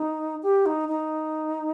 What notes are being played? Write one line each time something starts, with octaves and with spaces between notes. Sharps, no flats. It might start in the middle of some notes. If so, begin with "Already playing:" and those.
Already playing: D#4
G4
D#4
D#4